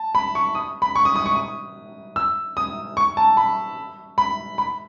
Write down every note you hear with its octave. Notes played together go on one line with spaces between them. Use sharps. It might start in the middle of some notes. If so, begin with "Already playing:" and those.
Already playing: A5
B5
C#6
D#6
B5
C#6
D#6
D#6
C#6
D#6
E6
D#6
C#6
A5
B5
B5
B5